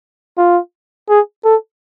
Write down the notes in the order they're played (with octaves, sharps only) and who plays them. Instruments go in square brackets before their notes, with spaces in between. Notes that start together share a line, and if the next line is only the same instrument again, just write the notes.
[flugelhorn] F4
G#4
A4